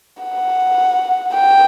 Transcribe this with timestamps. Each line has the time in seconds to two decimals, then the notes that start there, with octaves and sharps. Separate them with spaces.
0.23 F#5
1.35 G5